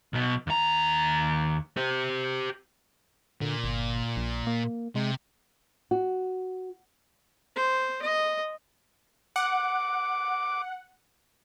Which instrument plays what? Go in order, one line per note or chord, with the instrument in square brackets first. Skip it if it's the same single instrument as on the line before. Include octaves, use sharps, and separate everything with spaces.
[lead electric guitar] B1 B2
D#2 A#5
G4 C5
[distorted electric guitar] A#2 [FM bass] D3
[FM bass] G1
A#1
A#3
[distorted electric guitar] C3 [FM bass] G#3
[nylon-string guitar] F#4
[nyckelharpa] C5
D#5
[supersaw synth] F#5 [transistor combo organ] D6